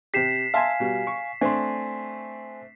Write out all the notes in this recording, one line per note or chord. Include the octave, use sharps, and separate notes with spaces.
C3 G4 B6 C7 E7
E5 F5 G#5 A5 C6
B2 G3
C#6
A3 C4 D4 G#5 C6